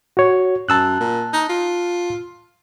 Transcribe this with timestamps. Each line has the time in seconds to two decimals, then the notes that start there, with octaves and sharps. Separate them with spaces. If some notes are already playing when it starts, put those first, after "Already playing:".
0.17 F#4 C#5
0.69 F#2 A5 E6 F#6
1.00 A#2
1.33 D#4
1.49 F4